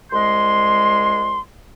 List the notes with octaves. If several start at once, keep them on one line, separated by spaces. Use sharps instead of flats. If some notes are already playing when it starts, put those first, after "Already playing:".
C2 G#3 C6